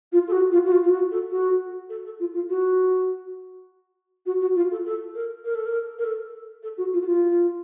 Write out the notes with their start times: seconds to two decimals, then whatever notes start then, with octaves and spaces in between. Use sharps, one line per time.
0.12 F4
0.27 A4
0.32 F#4
0.51 F4
0.65 F#4
0.71 F4
0.82 F4
0.91 F#4
1.11 A4
1.30 F#4
1.89 A4
2.04 A4
2.19 F4
2.33 F4
2.49 F#4
4.26 F#4
4.41 F#4
4.55 F4
4.71 A4
4.85 A4
5.14 A#4
5.44 A#4
5.54 A4
5.65 A#4
5.98 A#4
6.03 A4
6.63 A4
6.77 F#4
6.93 F4
7.01 F#4
7.06 F4